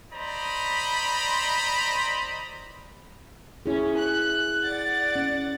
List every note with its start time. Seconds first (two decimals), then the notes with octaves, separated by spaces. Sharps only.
0.13 C5 D5 D#5 A#5 B5
3.66 C#4 E4 G#4
3.97 F#6
4.64 D5 F#5 A6
5.16 C#4